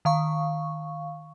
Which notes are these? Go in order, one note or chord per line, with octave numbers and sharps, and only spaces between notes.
D#3 F5 C#6